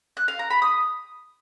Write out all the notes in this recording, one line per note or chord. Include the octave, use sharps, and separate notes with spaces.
F#6
F5
A#5
B5
D#6